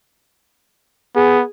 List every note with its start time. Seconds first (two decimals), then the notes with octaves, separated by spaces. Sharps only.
1.15 B3 G#4